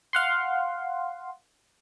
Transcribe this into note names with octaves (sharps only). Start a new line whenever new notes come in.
F5 F#5 C6